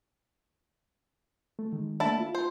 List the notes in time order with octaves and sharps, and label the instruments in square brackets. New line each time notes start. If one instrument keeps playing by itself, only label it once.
[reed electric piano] A3
D#3 G#3
[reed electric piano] A3 A#3 D4 [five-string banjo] E4 A5
[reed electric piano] F4
[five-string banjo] C5